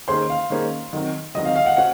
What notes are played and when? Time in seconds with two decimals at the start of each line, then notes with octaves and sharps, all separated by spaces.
0.08 D#3 A#3 C#4 G#4 C5 C6
0.30 F5
0.50 D#3 A#3 C#4 G#4 C5
0.93 D#3 F#3 C4
1.35 D#3 F#3 C4 D#5
1.45 F5
1.56 F5
1.66 F#5
1.77 C#4 F#4 C5 F#5